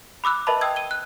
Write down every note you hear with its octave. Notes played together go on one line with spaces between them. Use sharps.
B5 D6 E6 F#6
A#4 B4 D#5 E5 A5 B5
G5 D#6 E6 G#6
D#7 G7
F#6